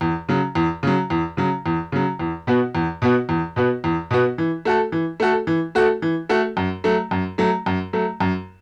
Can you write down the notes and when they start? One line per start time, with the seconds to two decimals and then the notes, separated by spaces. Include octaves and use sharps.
0.01 E2
0.29 C#3 F#3
0.55 E2
0.83 C#3 F#3
1.10 E2
1.37 C#3 F#3
1.66 E2
1.92 C#3 F#3
2.19 E2
2.47 B2 B3 F#4
2.75 E2
3.02 B2 B3 F#4
3.29 E2
3.56 B2 B3 F#4
3.84 E2
4.11 B2 B3 F#4
4.38 E3
4.65 A3 F#4 A4
4.92 E3
5.20 A3 F#4 A4
5.47 E3
5.75 A3 F#4 A4
6.02 E3
6.29 A3 F#4 A4
6.57 F#2
6.84 F#3 A3
7.11 F#2
7.38 F#3 A3
7.66 F#2
7.93 F#3 A3
8.20 F#2